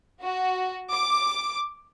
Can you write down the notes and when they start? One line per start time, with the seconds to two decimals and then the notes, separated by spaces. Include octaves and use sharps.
0.21 F#4
0.91 D6